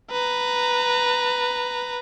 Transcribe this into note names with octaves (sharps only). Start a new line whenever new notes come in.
B4 A#5